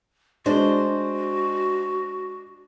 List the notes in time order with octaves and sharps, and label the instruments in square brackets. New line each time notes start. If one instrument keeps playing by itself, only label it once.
[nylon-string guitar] G#3 [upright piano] D4 [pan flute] F#4 [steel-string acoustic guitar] C5